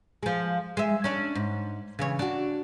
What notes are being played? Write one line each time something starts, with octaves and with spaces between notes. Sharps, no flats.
F3 G#3
G#3 E5
C#4 D4
G#2
C#3 E3 C#5
D4 F#4